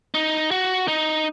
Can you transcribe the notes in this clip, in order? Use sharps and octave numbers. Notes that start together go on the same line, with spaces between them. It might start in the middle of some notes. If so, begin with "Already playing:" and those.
D#4
F#4
D#4